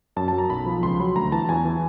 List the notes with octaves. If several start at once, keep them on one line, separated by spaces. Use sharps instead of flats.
F#2 A5
F#3 A5
A#5
B1 B5
F3
C#2 C6
F#3 B5
D2 A#5
E3 A5
E2 G#5
E3